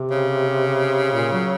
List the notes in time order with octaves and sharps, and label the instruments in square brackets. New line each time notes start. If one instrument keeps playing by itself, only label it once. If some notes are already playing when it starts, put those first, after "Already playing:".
Already playing: [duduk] C3
[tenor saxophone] C#3
[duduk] A#2
F#3